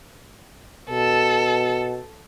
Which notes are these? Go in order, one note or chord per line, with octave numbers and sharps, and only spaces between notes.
B2 A4